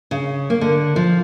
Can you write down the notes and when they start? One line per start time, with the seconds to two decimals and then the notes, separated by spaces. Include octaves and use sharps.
0.11 C#3
0.50 A#3
0.61 D3
0.96 F3